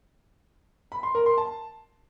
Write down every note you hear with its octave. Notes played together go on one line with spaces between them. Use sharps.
B5
C6
A#4
C6
A5